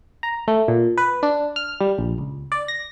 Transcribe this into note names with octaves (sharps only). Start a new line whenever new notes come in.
A#5
A3
A#2
B4
D4
F6
G3
A#1
C#2
D5
A#6